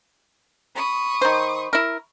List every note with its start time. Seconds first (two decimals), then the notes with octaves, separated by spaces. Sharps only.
0.74 B5 C#6 D#6
1.21 D#3 C5
1.73 E4 A#4